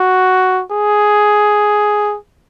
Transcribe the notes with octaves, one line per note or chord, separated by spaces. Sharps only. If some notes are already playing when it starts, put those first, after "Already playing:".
Already playing: F#4
G#4